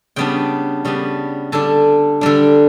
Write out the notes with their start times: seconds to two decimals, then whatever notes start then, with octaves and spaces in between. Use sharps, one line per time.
0.16 C#3 G3 B3 D4 G5
0.85 C#3 G3 B3 D4
1.52 D3 G3 D4 A5
2.21 D3 G3 D4